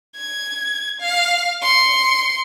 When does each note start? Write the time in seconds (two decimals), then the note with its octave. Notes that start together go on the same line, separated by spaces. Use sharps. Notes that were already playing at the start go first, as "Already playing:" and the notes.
0.16 G#6
1.00 F5
1.62 C6 C#7